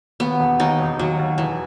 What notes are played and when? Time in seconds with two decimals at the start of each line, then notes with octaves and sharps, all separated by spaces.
0.20 D#2 B3
0.39 E1
0.60 D#2 D#4
0.79 E1
0.99 D#2 F#3
1.19 D#2
1.38 E1 E3